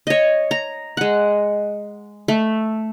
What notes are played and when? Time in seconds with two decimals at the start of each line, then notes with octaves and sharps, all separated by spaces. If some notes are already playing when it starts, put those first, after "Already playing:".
0.07 C#5 D#5
0.51 A#5
0.97 G#3 F#5
2.28 A3